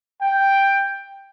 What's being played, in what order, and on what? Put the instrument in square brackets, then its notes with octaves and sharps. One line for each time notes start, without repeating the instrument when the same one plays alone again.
[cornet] G5